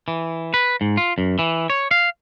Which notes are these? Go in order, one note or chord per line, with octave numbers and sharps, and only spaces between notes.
E3
B4
G#2
F4
F#2
E3
C#5
F5